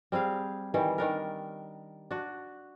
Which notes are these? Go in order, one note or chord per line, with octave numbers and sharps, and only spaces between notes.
G3 C4 G#4 F5
D#3 E3 G3
D#3 D4 A#4
D4 F#4